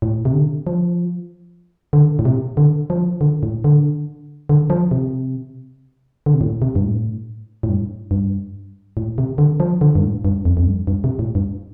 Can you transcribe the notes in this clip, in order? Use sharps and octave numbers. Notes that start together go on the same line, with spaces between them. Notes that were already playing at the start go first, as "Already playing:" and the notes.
A2
C3
D3
F3
D3
A2
C3
D3
F3
D3
A2
D3
D3
F3
C3
D3
C3
A2
C3
G2
A2
A2
G2
G2
A2
C3
D3
F3
D3
G2
A2
G2
F2
F2
G2
G2
C3
A2
G2